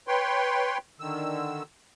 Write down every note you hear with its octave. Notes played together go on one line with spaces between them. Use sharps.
B4 C#5 G5 C6
D3 D#3 E6